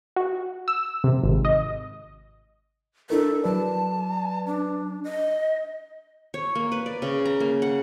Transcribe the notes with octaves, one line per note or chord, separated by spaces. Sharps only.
F#4
E6
C3
G#1
D#5
D4 E4 A4 A#4
F#3 B4 D5 A5
D4
D#5
C#5
A#3
B4
D5
C#3
A#5
A#3
F#5